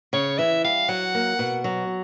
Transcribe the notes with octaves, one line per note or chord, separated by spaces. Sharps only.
C#3 C#5
E3 E5
G3 F5
F#3 F#5
A#3
B2
F#3